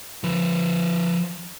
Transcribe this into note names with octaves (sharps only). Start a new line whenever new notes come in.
F3 B4